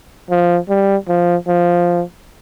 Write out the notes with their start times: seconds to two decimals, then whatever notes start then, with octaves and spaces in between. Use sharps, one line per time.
0.30 F3
0.69 G3
1.09 F3
1.48 F3